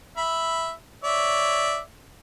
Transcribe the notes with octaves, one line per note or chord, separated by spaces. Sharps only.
E5 B5
C#5 D5 E5